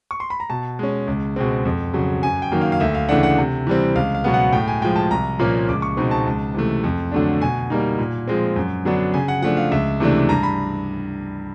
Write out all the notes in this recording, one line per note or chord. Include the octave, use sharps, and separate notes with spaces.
C#6
C6
B5
A#5
B2 A5
G#3 C#4
C#2
B2 G#3 C4
F2
C#3 F#3
F#2 G#5
G5
D#3 F#3 A#3
F5
F5
D2 E5
F5
C#3 E3 A3 D4 F#5
F#5
C3
E3 G3 C4
C#2 F5
F5
B2 F#3 B3
F#5
A2 G5
G#5
F3 G#3 G5
A5
C2 A#5
A#2 F3 A#3 C#4
C#2 D6
C#6
B2 G#3 C4 D#4
A5
C#2
C3 E3 A3
F2
D3 F#3 A3 D4
B2 G#5
G3 A#3 D#4
A#2
F3 G#3 C4
F#2
D3 F#3 B3 D4
C#3 G#5
F#5
F3 A3 D4 F#5
F5
C#2 E5
C3 E3 A3 D4
G2 A#5
B5